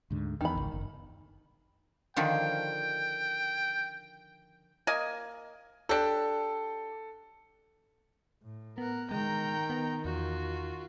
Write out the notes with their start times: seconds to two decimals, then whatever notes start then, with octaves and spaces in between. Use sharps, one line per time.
0.11 D2 G#2 D3
0.41 E2 D#3 B5
0.55 G#1 C#2
0.72 F#1
2.16 D3 D#3 F3 G5
4.87 A#3 D#5 G#5
5.89 D4 G4 A4
8.43 A2
8.78 B3 A#4 F#5
9.11 D#3 G#3 G5 A#5
9.70 B3
10.05 E2 F4 F#4